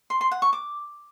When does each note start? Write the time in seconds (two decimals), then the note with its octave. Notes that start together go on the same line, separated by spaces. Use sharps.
0.10 C6
0.21 C6
0.31 F#5
0.42 C#6
0.53 D6